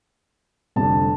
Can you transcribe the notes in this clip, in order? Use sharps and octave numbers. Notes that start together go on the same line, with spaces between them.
F1 F2 D3 G3 D4 A5